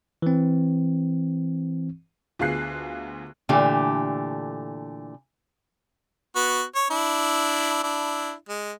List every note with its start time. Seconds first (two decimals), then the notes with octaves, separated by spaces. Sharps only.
0.22 E3 C4
2.39 D2 B3 F4 G#4 F#6 C7
3.49 A#2 D3 E3 A3 G4
6.36 B3 F#4
6.75 C#5
6.90 D4 E4
7.83 D4 E4
8.49 G#3